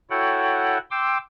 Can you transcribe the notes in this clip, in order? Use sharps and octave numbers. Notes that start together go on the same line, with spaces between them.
E4 F#4 A4 C#5 F#5 G5
G5 C6 D6 E6